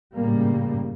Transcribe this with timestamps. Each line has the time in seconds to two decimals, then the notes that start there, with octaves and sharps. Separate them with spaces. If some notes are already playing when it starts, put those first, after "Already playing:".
0.16 G#1 F#2 A2 C#3 G3 A#3